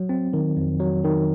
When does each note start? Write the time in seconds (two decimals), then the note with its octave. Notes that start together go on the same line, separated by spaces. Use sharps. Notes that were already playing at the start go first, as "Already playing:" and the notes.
Already playing: F#3
0.09 C4
0.33 D#3
0.57 F2
0.80 F#3
1.04 D#3